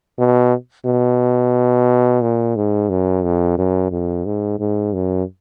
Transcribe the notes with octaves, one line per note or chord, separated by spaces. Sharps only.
B2
B2
A#2
G#2
F#2
F2
F#2
F2
G#2
G#2
F#2